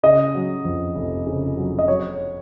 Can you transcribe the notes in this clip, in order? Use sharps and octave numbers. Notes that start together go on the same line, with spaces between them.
C#3 D#5
F#3
F2
F1
C#3
F#3
D#5
F#3 C#5